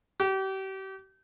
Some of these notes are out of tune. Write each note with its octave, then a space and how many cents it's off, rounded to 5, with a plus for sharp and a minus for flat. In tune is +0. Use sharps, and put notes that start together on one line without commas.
G4 -35